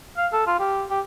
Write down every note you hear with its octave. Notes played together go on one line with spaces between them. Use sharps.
F5
A4
F4
G4
G4